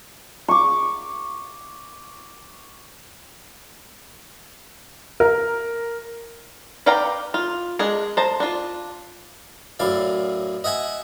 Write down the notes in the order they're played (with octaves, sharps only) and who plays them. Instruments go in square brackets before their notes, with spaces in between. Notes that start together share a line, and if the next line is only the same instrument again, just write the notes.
[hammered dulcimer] C#6 D6
[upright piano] A#4
[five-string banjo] B4 D5 F5 G5 A#5
F4
G#3 D4 G#4
C5 A5 A#5
D4 F4
[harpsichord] F#2 A2 E4 D5 F5
D#5 E5 F#5 G#5